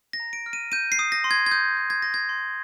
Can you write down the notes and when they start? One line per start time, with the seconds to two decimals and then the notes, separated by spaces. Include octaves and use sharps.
0.13 A#6
0.20 A#5
0.33 D7
0.46 F6
0.53 D#7
0.72 G6 D#7
0.92 C7
0.99 D#6
1.12 A#6
1.24 C6
1.31 G#6
1.46 G#6
1.51 D#6 G6
1.77 G6
1.90 G#6
2.02 C6 A#6
2.14 G#6
2.29 C6